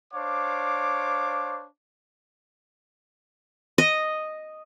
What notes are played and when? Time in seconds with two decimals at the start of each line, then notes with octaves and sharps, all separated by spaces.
0.13 D4 C5 C#5 F5 D6
3.78 D#5